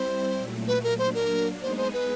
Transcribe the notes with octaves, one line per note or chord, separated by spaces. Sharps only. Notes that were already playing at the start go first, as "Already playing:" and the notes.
Already playing: G3 C4 E4 C5
A#2 F#3 A3
B4
A#4
F#3 A#3 D4 C5
A#4
G#3 B3 D#4 G#4 C5
C5
B4